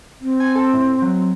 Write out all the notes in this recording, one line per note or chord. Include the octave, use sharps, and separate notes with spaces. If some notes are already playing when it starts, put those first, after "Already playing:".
C4
G#5
A4
A2
F#3